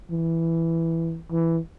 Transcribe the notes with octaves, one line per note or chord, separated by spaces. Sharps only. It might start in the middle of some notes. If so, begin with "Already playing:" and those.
E3
E3